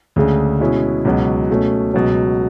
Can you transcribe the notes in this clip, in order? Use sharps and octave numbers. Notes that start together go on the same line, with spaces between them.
D2 C#3 G#3 D4
B2 G#3 C#4 E4
C#2 B2 F#3
B2 A3 C#4
C#2 B2 F#3